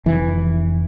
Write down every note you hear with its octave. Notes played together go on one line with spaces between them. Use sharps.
F1 E3